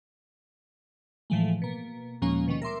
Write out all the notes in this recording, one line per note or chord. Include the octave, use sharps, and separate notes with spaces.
A2 E3 F3 G#3 A3
B2 A#3
D#2 A#2 F3 G#3 A#3 C#4
B2 D#3 G3 C#4
A#4 E5 C6 D6